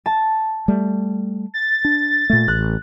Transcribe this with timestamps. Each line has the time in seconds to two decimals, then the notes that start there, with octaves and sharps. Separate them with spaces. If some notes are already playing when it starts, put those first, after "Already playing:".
0.06 A5
0.68 G3 A3
1.54 A6
1.85 D4
2.30 A#2 A3
2.48 A1 F#6